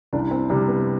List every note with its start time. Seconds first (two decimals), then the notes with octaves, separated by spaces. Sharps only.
0.13 C2 D4
0.31 C4
0.50 C3 G3 C4
0.68 B3